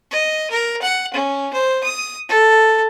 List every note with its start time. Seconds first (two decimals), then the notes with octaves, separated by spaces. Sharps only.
0.11 D#5
0.50 A#4
0.82 F#5
1.13 C#4
1.53 C5
1.83 D#6
2.29 A4